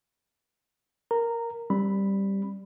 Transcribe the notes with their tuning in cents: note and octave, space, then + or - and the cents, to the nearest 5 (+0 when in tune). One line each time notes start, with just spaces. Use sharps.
A#4 +0 A#5 -15
G3 +0 C4 +35 B5 +0